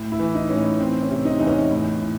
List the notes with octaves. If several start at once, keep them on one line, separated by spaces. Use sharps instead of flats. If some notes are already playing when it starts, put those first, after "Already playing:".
Already playing: A2
E4
E3
D#4
A2 C#4
D#4
E3 C4
C#4
C3
D#4
E2 D#4
C#4
A2
A2